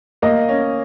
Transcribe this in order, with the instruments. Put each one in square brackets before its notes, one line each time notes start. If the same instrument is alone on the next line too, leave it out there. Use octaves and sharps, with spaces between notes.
[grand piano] A#3 [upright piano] D#5
[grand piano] C#4